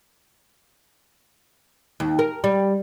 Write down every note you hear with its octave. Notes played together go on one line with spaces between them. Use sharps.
D#2
A#4
G3